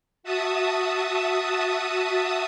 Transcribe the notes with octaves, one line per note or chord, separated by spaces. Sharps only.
F#4 E5 A5 D#6